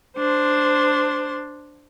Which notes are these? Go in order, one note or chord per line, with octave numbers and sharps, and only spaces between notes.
D4 C5 C6